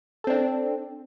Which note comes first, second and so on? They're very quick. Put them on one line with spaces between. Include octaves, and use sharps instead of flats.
A4 C4 D4